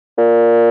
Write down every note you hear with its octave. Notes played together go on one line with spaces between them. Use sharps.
A#2